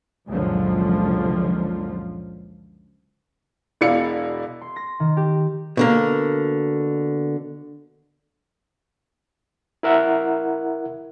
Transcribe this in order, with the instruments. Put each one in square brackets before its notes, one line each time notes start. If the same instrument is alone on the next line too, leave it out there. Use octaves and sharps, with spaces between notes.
[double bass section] C#2 F#2 A#2 D3 F3 F#3
[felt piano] E1 B2 E4 D5 F5 C#7
[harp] C6
A#6
D#3
G4
[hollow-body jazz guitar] B2 D3 A#3
[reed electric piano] E4 A#4 E5 F#5